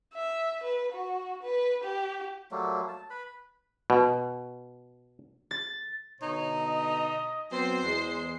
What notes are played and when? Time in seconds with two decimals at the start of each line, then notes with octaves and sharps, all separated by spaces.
0.14 E5
0.63 B4
0.92 F#4
1.43 B4
1.84 G4
2.51 F#3 G3 A3 A#3
2.88 A5
3.10 B4 B5
3.90 B2
5.51 A6
6.21 B2 D3 D#4 C#5
6.56 D#5
7.51 F#3 B3 C4 C5 C7
7.81 E2 G#3